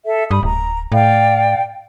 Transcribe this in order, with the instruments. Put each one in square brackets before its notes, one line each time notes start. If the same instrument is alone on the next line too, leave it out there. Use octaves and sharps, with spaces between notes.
[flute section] A4 E5
[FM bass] G2 [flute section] B5 D#6
[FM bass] D1 [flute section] A#5
[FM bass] A2 [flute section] D5 F5 G5